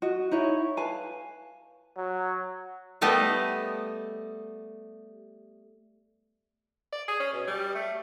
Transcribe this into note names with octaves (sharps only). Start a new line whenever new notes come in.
F#4 D#5
D#4 E4 C#5
B4 F5 G#5 A5
F#3
G3 A3 B3 G4 D#5
D5
G#4
C#4
B2
G3
A3